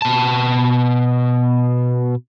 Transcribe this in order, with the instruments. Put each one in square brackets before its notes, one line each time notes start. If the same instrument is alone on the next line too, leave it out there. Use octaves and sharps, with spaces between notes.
[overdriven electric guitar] B2 A5